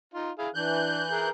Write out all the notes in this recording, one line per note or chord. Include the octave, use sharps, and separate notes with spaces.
D#4 F4
E4 G#4 F5
E3 D4 F#6 G6
G#4 A#4